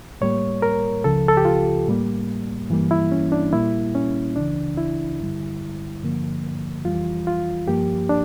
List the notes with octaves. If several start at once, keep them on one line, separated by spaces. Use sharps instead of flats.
A2 G3 A#3 C#5
A#4
C#2 C#3 F3 A4
A4
G4
F4
A2 G3 A#3
G2 E3 G3 A#3
E4
C#4
D4
A#2 G3 A#3 E4
C#4
C#2 C#3 E3 D4
E4
G2 D3 G3
G2 D3 F3 A#3
F2 E3 G3 F4
F4
G2 F3 A#3 G4
D4